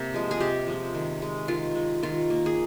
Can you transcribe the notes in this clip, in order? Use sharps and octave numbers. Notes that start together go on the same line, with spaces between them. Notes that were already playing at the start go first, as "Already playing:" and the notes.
Already playing: C3 A#3
F3 G#3
G#4
C3 G4
F3 G#3
D#3
G#3
D#3 F4
G#3
D#3 F4
A#3
G#4